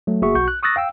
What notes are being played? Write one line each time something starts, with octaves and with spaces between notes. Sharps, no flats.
F#3 A3
G1 A#3 F#4 G#4 E5 C#6
B1 F#4 C#6 G6
F#6
C#6 D#6 E6 F#6 A6 A#6
F5 G5 E6